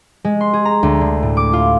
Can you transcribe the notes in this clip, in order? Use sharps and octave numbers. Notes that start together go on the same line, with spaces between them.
G#3
C6
G#4
A#5
D2
D3
A2
D6
F4